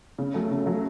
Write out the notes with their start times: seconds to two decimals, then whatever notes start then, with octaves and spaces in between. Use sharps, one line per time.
0.19 C#3
0.34 F#3 A3
0.51 C#3
0.66 F#3 A3